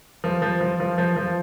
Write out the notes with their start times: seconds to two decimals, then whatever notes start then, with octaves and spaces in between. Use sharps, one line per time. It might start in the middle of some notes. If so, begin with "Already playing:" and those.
0.24 F3
0.42 F3
0.61 F3
0.80 F3
0.98 F3
1.17 F3